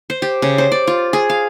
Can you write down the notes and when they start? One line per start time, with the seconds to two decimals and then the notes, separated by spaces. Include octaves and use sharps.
0.10 C5
0.22 G4
0.42 C#3
0.58 C5
0.72 D5
0.87 F4
1.13 G#4
1.30 F5